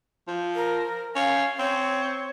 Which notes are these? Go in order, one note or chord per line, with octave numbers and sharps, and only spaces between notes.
F3
A#4
C#4 F5
C4 C#5